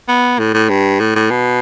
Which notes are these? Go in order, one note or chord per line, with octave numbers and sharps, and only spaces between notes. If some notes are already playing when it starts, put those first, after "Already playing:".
B3
A2
A2
G2
A2
A2
B2